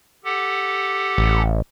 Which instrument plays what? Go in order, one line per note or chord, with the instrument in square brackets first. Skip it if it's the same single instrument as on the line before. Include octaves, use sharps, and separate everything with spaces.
[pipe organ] G4 A4 F#5
[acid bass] A1